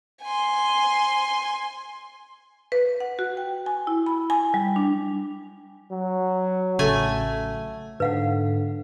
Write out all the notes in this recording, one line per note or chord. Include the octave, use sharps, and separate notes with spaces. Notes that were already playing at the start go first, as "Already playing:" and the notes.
G#5 C6
B4
F#5
F#4
G5
G#5
E4
B5
G#5
G3
D4
F#3
A1 C#3 A3 G#5
G#2 D3 B4 F5 F#5